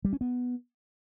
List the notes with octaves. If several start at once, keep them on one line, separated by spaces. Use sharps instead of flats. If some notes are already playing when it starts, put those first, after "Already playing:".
G3
C#4
B3